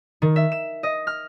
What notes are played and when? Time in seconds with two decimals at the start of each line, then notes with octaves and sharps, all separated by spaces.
0.22 D#3
0.36 E5
0.52 E7
0.83 D#5
1.07 F6